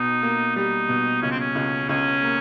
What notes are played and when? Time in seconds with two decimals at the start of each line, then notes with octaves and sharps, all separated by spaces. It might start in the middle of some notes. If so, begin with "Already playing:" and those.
Already playing: B2 D#4
0.22 A#3
0.56 G3 D#4
0.89 B2
1.22 C#2 C#4
1.31 C4
1.39 C#4
1.55 C#2
1.89 C#2 C#4
2.23 A#3